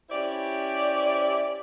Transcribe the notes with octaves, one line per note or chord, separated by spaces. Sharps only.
C#4 E4 G4 C5 D5